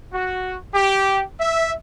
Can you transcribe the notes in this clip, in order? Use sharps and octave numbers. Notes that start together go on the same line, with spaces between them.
F#4
G4
E5